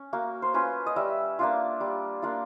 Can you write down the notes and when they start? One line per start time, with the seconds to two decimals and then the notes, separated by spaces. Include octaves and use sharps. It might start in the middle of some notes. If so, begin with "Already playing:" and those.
Already playing: C#4
0.13 A#3 F#4
0.42 C5
0.54 C#4 F4 B4
0.86 D#5
0.96 G3 E5
1.39 A#3 D4 F4
1.80 G3
2.22 A#3 D4 F4